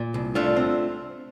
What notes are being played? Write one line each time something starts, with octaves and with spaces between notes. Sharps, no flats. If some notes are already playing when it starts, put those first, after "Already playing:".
Already playing: A#2
C2
A3 D4 F4
C4